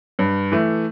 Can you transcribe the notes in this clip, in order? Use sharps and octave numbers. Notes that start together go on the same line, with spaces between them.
G2
E3 A3